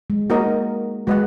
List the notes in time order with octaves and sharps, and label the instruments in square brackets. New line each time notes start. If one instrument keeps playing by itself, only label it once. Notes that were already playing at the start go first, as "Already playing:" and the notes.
[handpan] G#3
[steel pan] A#3 D#4 F#4 A#4 D#5
[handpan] G#3 [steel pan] F#4 B4 D#5 F#5